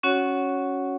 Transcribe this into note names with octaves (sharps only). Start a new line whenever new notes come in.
C#4 F#4 C#5 F#5